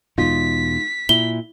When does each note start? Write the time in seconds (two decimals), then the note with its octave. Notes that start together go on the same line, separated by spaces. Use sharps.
0.18 E2 B2 G#3 D#4 F4 B6
1.09 A#2 E4 G7